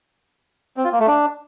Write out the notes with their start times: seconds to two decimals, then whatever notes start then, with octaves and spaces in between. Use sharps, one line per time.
0.77 C4
0.85 F4
0.92 A#3
1.00 A3
1.08 D4